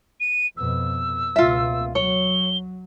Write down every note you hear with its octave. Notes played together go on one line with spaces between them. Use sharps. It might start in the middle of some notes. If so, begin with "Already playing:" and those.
D#7
F2 B2 E6
C#2 B2 A#3 F4 E5
F#3 C#5 G7